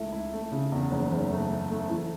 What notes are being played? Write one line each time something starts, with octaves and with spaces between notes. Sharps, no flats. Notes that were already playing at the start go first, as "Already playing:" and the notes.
Already playing: C#2 A3 E4
E4
A3
C#3
E2
F#1
F#1
A3
A3
A3
E3